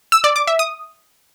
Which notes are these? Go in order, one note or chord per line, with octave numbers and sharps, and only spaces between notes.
E6
D5
D6
E5
D#6